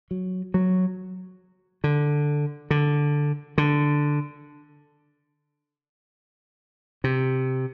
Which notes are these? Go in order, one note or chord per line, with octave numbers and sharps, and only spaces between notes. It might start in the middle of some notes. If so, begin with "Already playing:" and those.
F#3
F#3
D3
D3
D3
C3